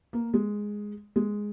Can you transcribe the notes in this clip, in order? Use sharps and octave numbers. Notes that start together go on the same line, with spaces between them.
A#3
G#3
G#3